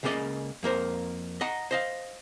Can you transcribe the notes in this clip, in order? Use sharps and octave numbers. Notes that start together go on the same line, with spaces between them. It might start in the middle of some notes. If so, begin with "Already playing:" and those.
C#2 C#3 A#3 F4 D5 D#5
F2 A#3 A#4 C5
D#5 F#5 A#5
C5 D#5 F5